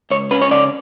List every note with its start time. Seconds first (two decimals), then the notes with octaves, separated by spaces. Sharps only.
0.11 C#2 C#5
0.31 C#4 B4
0.42 C#5
0.51 C#3 D5